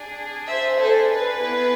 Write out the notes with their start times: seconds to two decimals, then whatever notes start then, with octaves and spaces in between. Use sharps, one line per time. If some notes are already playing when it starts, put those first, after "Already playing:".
Already playing: D4 G#4
0.48 C5 E5
0.79 A4 C5
1.10 B4
1.42 B3 E4 G#4